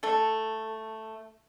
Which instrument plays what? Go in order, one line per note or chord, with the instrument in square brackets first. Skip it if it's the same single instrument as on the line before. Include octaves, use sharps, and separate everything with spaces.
[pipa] A3 A4